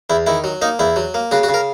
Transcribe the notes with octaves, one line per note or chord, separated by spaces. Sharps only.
E2 E4
D#3 E4
F#3
A#3 D#4
E2 E4
F#3
A#3
C#3 F#4
F#4
C#3
A#4